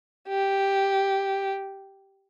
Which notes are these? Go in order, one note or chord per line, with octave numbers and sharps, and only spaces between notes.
G4